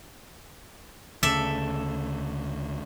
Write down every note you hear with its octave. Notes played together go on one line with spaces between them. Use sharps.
D2 C#3 A4 D5 E5